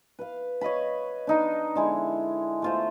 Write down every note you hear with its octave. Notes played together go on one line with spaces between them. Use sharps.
B4 F5
C#5 D#5 F5 B5
D4 D#4 D#5
D3 G#3 E4
A3 F4 C5